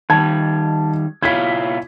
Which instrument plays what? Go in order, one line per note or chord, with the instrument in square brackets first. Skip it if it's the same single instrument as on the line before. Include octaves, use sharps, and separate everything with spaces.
[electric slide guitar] D#3 G3 [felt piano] A5 G#6
[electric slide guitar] B2 E4 F4 [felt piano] G#6 B6